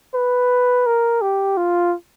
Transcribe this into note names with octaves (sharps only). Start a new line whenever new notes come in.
B4
A#4
G4
F4